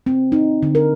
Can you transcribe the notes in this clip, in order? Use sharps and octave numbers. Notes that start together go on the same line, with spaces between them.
C4
D#4
D3
A#4